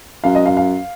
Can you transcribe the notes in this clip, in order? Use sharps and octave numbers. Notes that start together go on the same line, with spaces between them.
F#2 F5
D#5
F5
F5